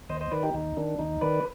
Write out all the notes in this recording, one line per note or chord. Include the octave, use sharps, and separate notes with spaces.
D#2 C5 D#5
C5 D#5
D#3 B4 D5
D#4 G4
D#2 D#4
D#3 D4
D#2 D#4
D#3 B4 D5